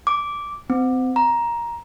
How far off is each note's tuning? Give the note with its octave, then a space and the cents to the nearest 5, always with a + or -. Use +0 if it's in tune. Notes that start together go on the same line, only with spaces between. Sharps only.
D6 -10
C4 -30
A#5 +10